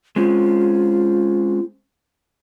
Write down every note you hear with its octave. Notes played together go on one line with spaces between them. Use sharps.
G#3 C4 C#4 F4